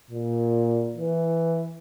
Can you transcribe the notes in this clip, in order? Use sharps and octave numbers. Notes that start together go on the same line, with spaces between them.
A#2
E3